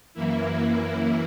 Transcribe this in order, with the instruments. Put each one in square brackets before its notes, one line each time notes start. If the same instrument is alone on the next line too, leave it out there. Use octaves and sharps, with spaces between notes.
[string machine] F#2 E3 A#3 E4